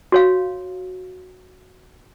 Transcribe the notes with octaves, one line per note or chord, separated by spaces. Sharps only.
F#4 C#5 F5